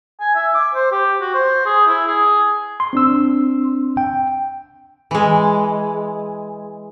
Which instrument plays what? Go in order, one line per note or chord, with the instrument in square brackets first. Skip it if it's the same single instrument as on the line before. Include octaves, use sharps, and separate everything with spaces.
[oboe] G#5
E5
D6
C5
G4
F#4
C5
G#4
E4
G#4
[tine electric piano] C6
[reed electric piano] C4 D4 E6
[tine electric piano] G5
[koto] E3 G#3